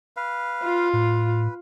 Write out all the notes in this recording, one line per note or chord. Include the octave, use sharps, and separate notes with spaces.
B4 F5
F4
A2 B4